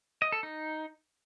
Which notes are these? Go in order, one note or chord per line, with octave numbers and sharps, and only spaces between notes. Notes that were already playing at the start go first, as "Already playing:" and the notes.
D#5
A4
D#4